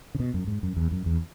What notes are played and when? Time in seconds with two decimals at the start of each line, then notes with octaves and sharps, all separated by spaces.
0.15 C#3
0.20 B2
0.34 F#2
0.47 G#2
0.63 F#2
0.77 E2
0.91 F#2
1.06 E2